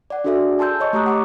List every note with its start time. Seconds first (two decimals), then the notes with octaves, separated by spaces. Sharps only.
0.10 D5 F#5
0.24 D4 F#4 G#4 A4 D5 E5
0.59 G#5 A5 C6 E6 G6
0.80 C#5 D#5 C#6
0.93 A3 G4 A#5 D#6 F#6
1.06 F#5 C#6 D6